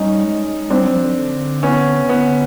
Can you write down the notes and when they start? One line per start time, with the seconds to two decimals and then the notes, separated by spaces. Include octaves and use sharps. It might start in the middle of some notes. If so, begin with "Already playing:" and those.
Already playing: G3 C#4 D#4
0.24 G#3
0.70 G3 C4 D4
0.82 F#3
0.93 F3
1.05 D3
1.63 B3 C#4
2.00 C#3
2.09 D3 B3